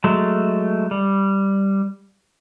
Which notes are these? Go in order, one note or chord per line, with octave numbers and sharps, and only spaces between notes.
F#3 G#3 A3
G3